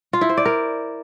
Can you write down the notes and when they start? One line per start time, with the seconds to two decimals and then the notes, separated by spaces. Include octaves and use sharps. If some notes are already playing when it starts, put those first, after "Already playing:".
0.13 F4
0.21 E4
0.29 C5
0.37 D5
0.45 A#4